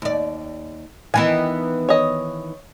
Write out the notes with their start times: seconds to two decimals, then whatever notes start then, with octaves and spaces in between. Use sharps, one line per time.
0.02 D#2 D5
1.14 D#3 E3 B3 G#5
1.89 C#5 D#5